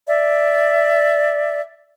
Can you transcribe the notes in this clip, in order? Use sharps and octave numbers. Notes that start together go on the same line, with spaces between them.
D5 E5